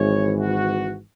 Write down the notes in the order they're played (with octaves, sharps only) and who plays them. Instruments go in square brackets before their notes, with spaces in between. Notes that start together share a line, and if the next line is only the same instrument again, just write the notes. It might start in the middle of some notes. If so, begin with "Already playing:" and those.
Already playing: [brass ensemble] G#1 G#2 E3 C#5
F#4